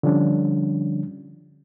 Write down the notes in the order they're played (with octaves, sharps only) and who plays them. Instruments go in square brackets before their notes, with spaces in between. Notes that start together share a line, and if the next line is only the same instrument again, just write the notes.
[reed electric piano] D3 F3 G3 C#4 D4